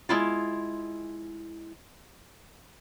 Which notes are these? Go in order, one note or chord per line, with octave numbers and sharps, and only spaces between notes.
G#3 C4 E4 F4